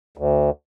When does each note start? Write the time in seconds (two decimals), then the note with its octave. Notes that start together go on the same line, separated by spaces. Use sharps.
0.17 D2